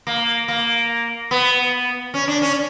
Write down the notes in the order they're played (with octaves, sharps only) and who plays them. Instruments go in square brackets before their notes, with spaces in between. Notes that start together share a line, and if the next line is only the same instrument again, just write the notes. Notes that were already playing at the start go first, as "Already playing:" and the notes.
[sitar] A#3
A#3
B3
C#4
D4
C#4